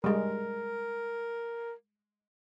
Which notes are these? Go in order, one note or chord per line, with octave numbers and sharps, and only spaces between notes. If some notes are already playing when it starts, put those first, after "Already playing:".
G3 G#3 A#4